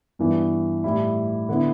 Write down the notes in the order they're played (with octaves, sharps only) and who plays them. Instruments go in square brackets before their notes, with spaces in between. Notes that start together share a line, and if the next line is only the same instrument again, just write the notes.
[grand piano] G2 E3 B3
A2 G3 E4
D3 B3 E4